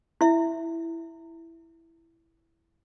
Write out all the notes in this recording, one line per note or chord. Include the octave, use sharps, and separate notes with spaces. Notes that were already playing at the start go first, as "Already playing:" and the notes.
E4 E5